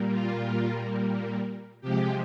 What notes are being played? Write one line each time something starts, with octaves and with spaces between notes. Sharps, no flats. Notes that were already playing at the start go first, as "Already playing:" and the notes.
Already playing: A#2 G3 A#3
F4
C3 F3 G#3 G4